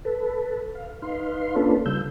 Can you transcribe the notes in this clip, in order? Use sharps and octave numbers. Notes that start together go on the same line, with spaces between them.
A4 B4
F5
D#4 B4 F5 C6
A#3 C#4 D4 F4 A4 B4
C#3 G3 E6 G6